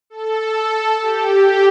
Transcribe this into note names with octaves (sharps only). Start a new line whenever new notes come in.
A4
G4